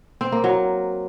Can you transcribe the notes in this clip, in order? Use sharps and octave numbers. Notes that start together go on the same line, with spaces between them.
C4
A#3
F#3